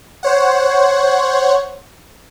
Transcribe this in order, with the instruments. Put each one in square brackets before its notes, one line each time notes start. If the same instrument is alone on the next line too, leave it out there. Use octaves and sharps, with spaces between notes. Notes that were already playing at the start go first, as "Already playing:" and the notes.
[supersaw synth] C5 C#5 F#5